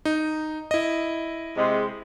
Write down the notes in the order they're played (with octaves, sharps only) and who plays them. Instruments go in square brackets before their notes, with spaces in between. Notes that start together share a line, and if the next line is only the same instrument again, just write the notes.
[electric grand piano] D#4
E4 D#5
[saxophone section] C3 G#3